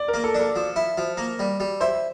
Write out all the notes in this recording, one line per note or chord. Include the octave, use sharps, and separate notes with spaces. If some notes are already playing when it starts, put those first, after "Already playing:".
Already playing: D5
A#4
A#3
A4
D4
A4
F3
E4
F3
A#3
G3
G3
E4 C5